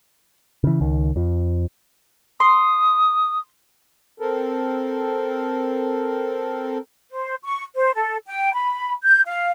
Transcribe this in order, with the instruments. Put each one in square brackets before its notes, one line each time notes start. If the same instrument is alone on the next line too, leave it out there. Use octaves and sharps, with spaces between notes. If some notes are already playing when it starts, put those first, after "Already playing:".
[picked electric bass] C#3 E3
C#2 D#3
F2 F3
[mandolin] C6 [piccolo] D#6
[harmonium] C4 A4 A#4
[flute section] C5
C#6
C5
A4
G5
B5
G6
F5